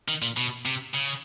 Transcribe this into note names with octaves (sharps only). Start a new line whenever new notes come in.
D#3
A#2
B2
C3
C#3